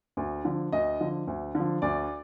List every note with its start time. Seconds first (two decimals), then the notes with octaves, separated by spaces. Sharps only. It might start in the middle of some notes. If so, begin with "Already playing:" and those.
0.17 D2
0.45 D3 F3
0.72 D2 D#5
1.00 D3 F3
1.27 D2
1.55 D3 F3
1.82 D2 D5